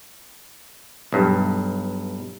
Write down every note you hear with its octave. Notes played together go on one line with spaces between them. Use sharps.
B1 G2